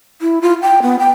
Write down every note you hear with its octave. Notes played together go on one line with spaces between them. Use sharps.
E4
F4
G5
B3
G5